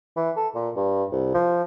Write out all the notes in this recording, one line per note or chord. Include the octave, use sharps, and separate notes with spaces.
E3
A4
A#2
G2
C2
F3